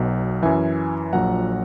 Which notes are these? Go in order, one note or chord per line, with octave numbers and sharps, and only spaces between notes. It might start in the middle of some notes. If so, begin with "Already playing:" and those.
Already playing: B1 B2 F#3
F#2 E3 E5 G#5
A#1 A#2 F#3 F#5 A#5